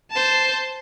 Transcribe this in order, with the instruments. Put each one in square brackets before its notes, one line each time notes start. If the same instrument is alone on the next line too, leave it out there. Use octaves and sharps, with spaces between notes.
[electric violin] C5 A5